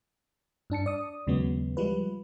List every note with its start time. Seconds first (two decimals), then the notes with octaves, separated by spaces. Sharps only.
0.70 G2 D4 A5 C#7
0.86 D5 D#6
1.27 D#2 C#3 F#3 G#3 B3
1.77 F3 G3 G#3 F4 B4